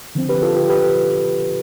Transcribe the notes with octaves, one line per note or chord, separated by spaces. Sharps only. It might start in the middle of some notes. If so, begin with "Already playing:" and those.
D3 F3 C4
G4 B4
F4 A4
G4
G4 B4